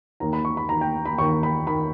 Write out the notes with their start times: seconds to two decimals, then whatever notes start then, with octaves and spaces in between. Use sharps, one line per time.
0.20 D#2 D#3 A#5
0.33 B5
0.45 C#6
0.57 B5
0.69 D#2 D#3 A#5
0.81 G5
1.06 B5
1.18 D#2 C#6
1.21 D#3
1.43 B5
1.67 D#3 B5